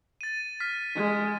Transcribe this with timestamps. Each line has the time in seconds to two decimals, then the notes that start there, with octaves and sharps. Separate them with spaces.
0.21 A6 D#7
0.60 F6 B6
0.95 G#3